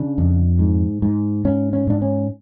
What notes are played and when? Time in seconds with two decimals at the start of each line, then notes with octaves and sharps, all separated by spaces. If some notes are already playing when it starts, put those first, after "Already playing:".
Already playing: C#3 D4
0.18 F2
0.59 G#2
1.02 G#2
1.45 G#2 C#4
1.73 C#4
1.87 G#2 D4
2.02 C#4